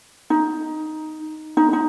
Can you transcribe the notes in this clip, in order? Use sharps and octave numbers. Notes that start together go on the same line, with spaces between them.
D#4
D#4
D#4